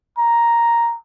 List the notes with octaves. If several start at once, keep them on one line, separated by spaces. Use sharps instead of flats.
A#5